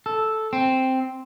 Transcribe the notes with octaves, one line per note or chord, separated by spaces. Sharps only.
A4
C4